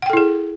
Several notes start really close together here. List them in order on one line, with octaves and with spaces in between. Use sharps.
F#5 G5 A4 E4 G#4